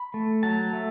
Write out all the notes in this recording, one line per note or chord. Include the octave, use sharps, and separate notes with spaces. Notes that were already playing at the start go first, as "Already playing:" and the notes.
Already playing: B5
A3
F#3 A5
A3